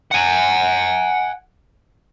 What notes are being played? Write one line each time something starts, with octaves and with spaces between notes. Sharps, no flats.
F#5 G#5